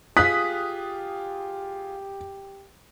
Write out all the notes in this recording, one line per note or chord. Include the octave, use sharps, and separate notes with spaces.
F4 G4 G#4 D#6 F#6 B6